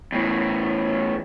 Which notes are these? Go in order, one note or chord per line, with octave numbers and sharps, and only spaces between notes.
E2 A2